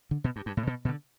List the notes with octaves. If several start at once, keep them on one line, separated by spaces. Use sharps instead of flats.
D3
B2
G2
G2
A2
B2
B2
D3